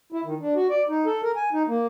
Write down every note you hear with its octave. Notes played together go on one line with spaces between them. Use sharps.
E4
D#3
D4
F#4
D5
D#4
A4
A#4
G#5
D#4
A#3